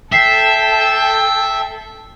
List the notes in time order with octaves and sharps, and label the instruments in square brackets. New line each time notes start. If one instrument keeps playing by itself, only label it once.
[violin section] A4 [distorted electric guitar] E5 [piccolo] G5 [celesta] B6 C7